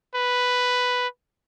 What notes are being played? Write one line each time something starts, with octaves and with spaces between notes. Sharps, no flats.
B4